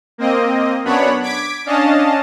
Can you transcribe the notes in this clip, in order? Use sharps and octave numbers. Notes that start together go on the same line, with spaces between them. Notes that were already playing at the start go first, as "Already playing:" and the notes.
A#3 C4 D#5
F#2 B3 D4 C#5 F#5 B5
D6 G#6 B6 D7
C#4 D4 D#5 F5 A5